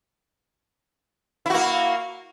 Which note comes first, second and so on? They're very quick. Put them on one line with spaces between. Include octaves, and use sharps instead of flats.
E4 F#4 A#3